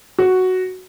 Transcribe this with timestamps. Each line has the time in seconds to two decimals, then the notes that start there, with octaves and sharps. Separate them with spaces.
0.19 F#4